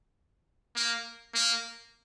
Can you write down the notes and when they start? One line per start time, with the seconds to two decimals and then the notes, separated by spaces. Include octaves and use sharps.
0.76 A#3
1.35 A#3